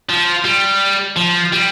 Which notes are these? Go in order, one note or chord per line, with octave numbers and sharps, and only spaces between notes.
F3
G3
F3
G3